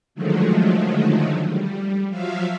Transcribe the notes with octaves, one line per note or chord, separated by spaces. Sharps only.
D3 D#3 F3 F#3 G#3 A3
G3
F3 F#3 E5 F5